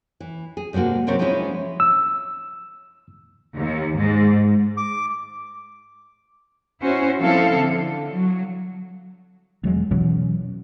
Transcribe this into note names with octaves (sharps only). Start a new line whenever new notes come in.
E3
G#4
G2 C3 G#3 A#3 F#4
C3 F#3 C4 A#4 C#5 D5
F3 G#3 C#4 D4 E4
E6
D#2
G#2
D6
C#4 E4 F#4 C5
F3 C4 E4 A4 F5
D3
F#3
E1 F#3 G#3
B2 E3 F#3 C#4